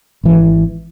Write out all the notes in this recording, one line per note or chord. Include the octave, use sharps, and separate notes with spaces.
G#1 E3